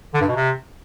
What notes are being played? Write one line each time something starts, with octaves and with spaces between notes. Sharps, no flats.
D3
G2
B2
C3